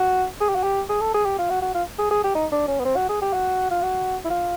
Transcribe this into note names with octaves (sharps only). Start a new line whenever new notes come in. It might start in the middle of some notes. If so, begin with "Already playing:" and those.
Already playing: F#4
G#4
G4
F#4
G4
G#4
A4
G#4
G4
F4
F#4
F#4
F4
G#4
G#4
G4
D#4
D4
C#4
B3
C4
F#4
G#4
G4
F#4
F4
F#4
E4
F4